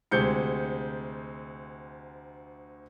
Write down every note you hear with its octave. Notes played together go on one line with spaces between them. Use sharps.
D2 C3 G#3 G6 C#7